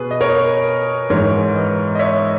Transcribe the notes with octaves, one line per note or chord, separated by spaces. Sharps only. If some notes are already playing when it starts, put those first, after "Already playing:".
Already playing: B2 G#4 B4
D#5
A#4 C#5
G#2 E3 G#3 A#4 C#5
B4 D#5
D#5
C#5 E5